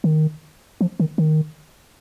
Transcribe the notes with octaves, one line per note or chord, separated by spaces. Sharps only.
D#3
F3
D#3
D#3